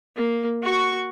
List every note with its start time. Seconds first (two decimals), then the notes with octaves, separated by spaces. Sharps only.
0.16 A#3
0.63 F#4 C#6